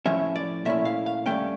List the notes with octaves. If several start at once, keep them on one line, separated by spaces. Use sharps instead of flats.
A2 F3 C#4 E5
D5
A#2 A3 C#4 E4 E5
F5
F5
G2 F3 A3 C#4 G5